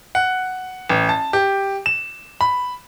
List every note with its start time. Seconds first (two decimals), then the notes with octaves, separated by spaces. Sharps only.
0.15 F#5
0.90 A1
1.09 A5
1.33 G4
1.86 E7
2.41 B5